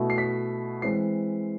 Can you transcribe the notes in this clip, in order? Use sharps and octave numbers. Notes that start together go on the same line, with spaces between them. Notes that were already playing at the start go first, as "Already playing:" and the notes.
Already playing: B2 A3 E4
C7
B6
E3 G#3 C4 C7